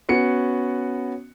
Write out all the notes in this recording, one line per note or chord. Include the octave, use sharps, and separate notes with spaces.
B3 C#4 F#4 C#7